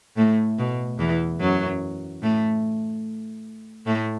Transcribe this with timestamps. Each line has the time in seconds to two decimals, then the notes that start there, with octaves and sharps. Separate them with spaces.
0.17 A2 A3
0.59 B2
0.99 E2 E3
1.40 F#2 F#3
2.22 A2 A3
3.86 A2 A3